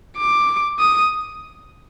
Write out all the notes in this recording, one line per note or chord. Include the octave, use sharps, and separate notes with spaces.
D6
D#6